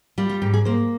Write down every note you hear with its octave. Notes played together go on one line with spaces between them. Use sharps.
G3 F4
F4
G#2 G4
G#4
A#3 C5